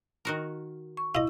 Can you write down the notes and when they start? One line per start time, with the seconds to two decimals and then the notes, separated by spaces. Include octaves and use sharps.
0.25 D#3 F#4 A#4
0.97 C#6
1.15 E4 F4 D#5